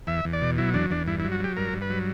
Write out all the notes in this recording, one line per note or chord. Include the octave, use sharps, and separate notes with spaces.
E2 E5
E2
D5
B2
F#3 E4
E2 D4
E2 D4
G2 E4
E4
F#3
F#4
F#3 G4
G2 A#4
G2
B4
F#3